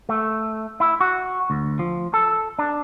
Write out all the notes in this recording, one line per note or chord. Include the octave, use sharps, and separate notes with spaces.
A3
E4
F#4
D2
F3
A4
D4